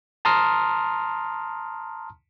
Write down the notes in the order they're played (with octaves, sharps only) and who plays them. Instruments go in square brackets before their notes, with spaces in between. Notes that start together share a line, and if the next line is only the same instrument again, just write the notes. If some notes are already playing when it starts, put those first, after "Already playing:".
[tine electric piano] A5 A#5 C6 D#6 F6